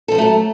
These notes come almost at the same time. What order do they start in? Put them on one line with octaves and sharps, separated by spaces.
A4 F3 A#3 A3 F#3